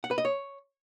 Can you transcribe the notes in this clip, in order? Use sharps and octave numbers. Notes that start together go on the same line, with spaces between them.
F#5
B4
D#5
C#5